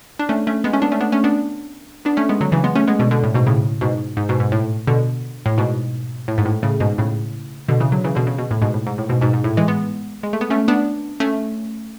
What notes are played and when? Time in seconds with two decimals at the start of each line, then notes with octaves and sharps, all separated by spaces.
0.19 D4
0.29 A3 C#4
0.47 A3 C#4
0.64 G#3 B3
0.73 A3 C#4
0.82 B3 D4
0.92 A3 C#4
1.01 B3 D4
1.12 A3 C#4
1.24 B3 D4
2.05 B3 D4
2.17 A3 C#4
2.29 G#3 B3
2.41 D3 F#3
2.52 C#3 E3
2.64 G#3 B3
2.75 A3 C#4
2.88 G#3 B3
2.99 B2 D3
3.11 B2 D3
3.24 A2
3.34 G#2 B2
3.46 A2 C#3
3.81 G#2 B2
4.17 G#2
4.29 G#2 B2
4.40 G#2
4.52 A2
4.87 B2 D3
5.46 A2
5.58 G#2 B2
6.28 A2
6.38 G#2
6.45 A2
6.63 A2 C#3
6.80 G#2 B2
6.98 A2 C#3
7.69 B2 D3
7.80 C#3 E3
7.92 D3 F#3
8.04 C#3 E3
8.15 B2 D3
8.27 C#3
8.38 B2
8.51 A2
8.62 G#2 B2
8.74 A2
8.87 G#2
8.98 A2
9.09 G#2 B2
9.21 G#2 B2
9.33 G#2
9.44 A2
9.57 E3 G#3
9.68 G#3 B3
10.23 G#3
10.33 A3
10.41 B3
10.50 A3 C#4
10.68 B3 D4
11.20 A3 C#4